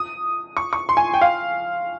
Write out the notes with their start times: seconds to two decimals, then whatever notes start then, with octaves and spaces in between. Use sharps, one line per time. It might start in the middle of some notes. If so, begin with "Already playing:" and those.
Already playing: D#6
0.57 C#6
0.73 C#6
0.89 C6
0.97 G#5
1.14 G5
1.21 F5